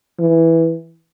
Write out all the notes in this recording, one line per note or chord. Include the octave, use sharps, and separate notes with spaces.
E3